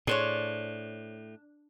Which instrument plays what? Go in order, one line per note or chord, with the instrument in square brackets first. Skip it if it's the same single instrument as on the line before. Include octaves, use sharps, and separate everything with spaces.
[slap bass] A2 [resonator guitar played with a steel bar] D4 [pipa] G#4 C5 C#5